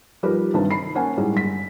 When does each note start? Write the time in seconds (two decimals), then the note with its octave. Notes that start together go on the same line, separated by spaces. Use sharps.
0.23 F3 G3 D#4 G4 A#4 B4
0.54 C2 G2 D#3 C4 B4 A5
0.71 D#3 B5 C7
0.95 A#3 C#4 C5 F#5 G#5 A5
1.17 A2 G3 G#3 D#4
1.34 G1 B6